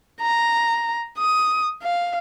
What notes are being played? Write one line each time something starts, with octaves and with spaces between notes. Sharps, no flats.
A#5
D#6
F5